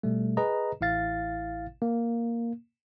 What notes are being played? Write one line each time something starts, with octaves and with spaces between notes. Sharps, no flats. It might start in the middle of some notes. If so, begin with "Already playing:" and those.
B2 G3 A3
G#4 B4 D#5 A#5
A1 E4 F5 A6
A#3